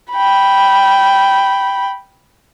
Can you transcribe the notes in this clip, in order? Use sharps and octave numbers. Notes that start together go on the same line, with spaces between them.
G5 B5